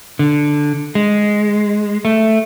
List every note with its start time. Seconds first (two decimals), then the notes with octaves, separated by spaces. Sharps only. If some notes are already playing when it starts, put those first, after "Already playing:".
0.19 D3
0.95 G#3
2.05 A3